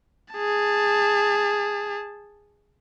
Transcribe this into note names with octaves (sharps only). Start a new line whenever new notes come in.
G#4 A5